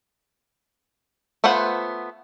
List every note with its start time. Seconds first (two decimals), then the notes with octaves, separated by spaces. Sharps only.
1.44 A3 B3 F4 C5 F#5